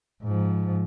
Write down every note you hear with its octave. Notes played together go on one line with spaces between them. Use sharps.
G#2 F3